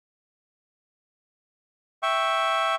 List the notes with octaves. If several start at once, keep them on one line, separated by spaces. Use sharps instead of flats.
E5 G5 C#6